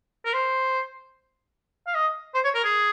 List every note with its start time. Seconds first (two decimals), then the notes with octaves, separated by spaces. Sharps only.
0.25 A#4
0.33 C5
1.87 F5
1.94 D#5
2.34 C5
2.44 C#5
2.55 A#4
2.64 G#4